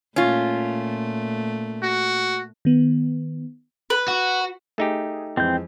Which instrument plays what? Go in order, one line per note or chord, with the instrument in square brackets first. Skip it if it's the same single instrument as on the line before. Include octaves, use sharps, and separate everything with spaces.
[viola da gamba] A#2 A3 [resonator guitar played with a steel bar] C#4 F4
[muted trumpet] F#4
[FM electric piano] D#3 B3
[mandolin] B4
[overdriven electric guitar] F#4
[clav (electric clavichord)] A3 D#4 G4 [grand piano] G#4
[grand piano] F2 E3 G#3 [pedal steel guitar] C4 G6